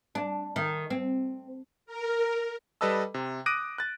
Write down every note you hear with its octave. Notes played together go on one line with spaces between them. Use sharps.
D4
D#3
C4
A#4
G3 A4 B4 D#5 A5 E6
C3
D6 D#6 F#6 A#6 D7 D#7
F#6 A6